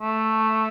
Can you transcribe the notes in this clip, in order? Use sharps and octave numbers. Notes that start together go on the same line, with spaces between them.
A3